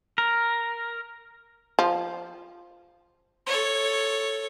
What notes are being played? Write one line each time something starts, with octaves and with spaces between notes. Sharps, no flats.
A#4
F3
A4 C#5